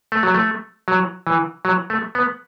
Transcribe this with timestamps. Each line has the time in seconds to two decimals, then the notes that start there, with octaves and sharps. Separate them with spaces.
0.12 A3
0.23 F#3
0.34 A3
0.88 F#3
1.27 E3
1.65 F#3
1.90 A3
2.15 B3